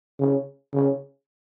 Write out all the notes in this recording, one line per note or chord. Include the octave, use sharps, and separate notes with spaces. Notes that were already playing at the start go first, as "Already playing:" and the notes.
C#3
C#3